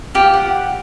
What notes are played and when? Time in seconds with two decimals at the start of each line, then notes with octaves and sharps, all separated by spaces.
0.15 F4 G4
0.34 F#5